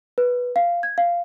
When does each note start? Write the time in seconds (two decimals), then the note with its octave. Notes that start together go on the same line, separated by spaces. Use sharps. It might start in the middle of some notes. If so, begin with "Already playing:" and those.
0.18 B4
0.56 F5
0.83 G#6
0.98 F5